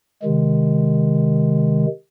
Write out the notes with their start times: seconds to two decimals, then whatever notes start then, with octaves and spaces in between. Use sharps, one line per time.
0.22 C3 D#3 G#3